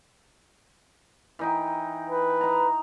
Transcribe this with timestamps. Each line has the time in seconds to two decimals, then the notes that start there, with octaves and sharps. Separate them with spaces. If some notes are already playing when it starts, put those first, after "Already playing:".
1.39 E3 D#4 G5
2.10 B4
2.41 D#4 A#5